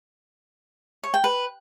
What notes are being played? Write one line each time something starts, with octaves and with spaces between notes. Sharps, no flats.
C#5
G5
B4